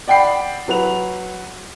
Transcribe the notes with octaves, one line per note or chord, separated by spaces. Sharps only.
D5 F#5 G5 B5 C7
F#3 B4 F#5 F7